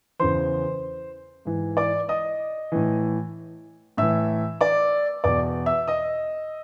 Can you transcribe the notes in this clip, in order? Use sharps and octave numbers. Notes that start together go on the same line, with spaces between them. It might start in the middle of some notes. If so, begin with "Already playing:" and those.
E2 C#3 E3 C5 C6
G#2 E3
D5 D6
D#5 D#6
A2 E3
A2 E3 E5 E6
D5 D6
E2 B2 D5 D6
E5 E6
D#5 D#6